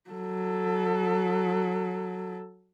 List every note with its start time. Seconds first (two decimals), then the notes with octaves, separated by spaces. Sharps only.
0.10 F#3 A4